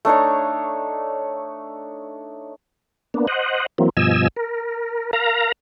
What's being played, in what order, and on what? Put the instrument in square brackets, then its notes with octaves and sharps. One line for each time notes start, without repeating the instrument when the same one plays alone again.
[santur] A3 D4 D#4 C#5
[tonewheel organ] A#3 B3 D4
C5 D#5 F#5
E3 F#3 A#3 C4
G2 B2 F3 D#5 G#5 E6
A#4
A#4 F5 A#5